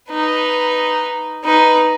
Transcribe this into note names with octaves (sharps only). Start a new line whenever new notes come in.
D#4 B4
D#4 B4